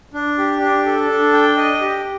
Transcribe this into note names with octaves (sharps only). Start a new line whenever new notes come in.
D4
G4
D4
A4
D4
G5
D#5
G4